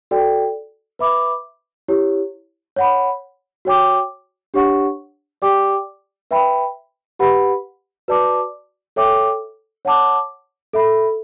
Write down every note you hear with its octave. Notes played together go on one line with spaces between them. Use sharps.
F#4 A4 D5 G5
B4 E5 B5 D6
E4 G4 C#5
C#5 F#5 B5
F#4 C#5 G5 D6
D4 G4 C#5 F#5 C#6
G4 D5 G5 D6
B4 E5 G5 B5
G4 B4 F#5 B5
F#4 B4 D5 A5 D6
A4 C#5 E5 G5 D6
C#5 F#5 A5 D6
A4 E5 B5